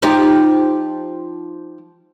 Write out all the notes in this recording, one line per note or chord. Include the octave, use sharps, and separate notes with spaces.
F3 D#4 G4